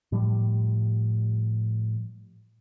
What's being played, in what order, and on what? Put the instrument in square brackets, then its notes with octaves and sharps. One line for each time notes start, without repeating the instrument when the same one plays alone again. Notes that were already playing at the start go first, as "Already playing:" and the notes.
[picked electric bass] A2 F3 G3